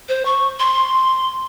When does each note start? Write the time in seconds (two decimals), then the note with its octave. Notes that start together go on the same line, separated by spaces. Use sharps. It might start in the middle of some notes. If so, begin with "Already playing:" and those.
0.08 C5
0.25 C#6
0.59 C6